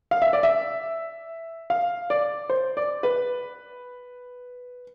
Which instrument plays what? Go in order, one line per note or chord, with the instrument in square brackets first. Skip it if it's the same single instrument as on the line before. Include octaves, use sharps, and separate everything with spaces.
[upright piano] F5
E5
D5
E5
F5
D5
C5
D5
B4